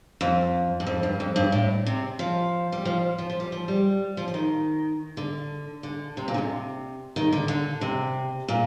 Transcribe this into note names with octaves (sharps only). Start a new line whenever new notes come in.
F2
G2
F2
G2
F2
G2
A2
C3
F3
G3
F3
F3
F3
G3
F3
G3
F3
F3
D#3
D3
D3
C3
A#2
D3
C3
D#3
D3
D3
C3
A#2